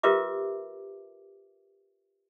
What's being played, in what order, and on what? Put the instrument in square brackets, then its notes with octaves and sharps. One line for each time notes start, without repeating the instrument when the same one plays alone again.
[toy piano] F4 G4 A#4 B4 E5 D6